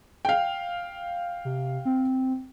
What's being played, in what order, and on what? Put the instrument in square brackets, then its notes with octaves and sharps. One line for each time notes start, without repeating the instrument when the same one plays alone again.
[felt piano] F5 G5
[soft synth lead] C3
C4